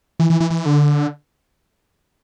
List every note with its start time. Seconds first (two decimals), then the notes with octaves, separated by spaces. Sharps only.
0.20 E3
0.30 E3
0.40 E3
0.50 E3
0.66 D3